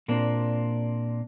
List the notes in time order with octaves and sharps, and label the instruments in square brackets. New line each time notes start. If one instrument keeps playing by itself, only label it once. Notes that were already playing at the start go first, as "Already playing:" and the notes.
[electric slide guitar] A#2 A#3 C4 D4